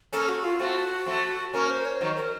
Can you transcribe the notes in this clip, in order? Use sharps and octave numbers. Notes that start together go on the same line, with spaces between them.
A#3 C#4 A4
F#4
F4
A3 C4 F#4
A3 C4
A#3 C#4 A#4
C5
C#5
D#3 F#3 C5
A#4